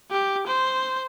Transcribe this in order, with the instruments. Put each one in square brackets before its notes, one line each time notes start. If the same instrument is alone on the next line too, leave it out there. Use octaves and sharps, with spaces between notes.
[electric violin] G4
C5